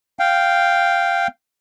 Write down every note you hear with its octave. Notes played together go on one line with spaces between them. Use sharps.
F5 G5